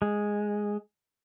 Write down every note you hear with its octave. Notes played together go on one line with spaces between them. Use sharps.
G#3